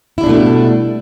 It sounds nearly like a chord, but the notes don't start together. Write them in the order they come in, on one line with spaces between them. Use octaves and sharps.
E4 G3 D4 B2 A3